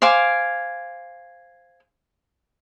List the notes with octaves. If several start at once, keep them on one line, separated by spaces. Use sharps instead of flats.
C5 F5 G#5 D6